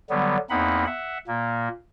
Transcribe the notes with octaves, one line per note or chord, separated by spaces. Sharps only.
D3 F#3 G3 B3
E2 A#3 C4 D#4 F#5 B5
E5 F#5
A#2 A#3